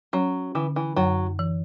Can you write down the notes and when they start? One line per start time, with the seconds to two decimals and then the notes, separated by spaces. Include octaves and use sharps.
0.13 F#3 C#4
0.55 D3 E3
0.76 E3
0.96 F#2 F#3
1.39 E3